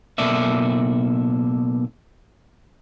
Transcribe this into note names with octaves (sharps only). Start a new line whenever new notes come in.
B1 B2 A#3 A4 D5 E5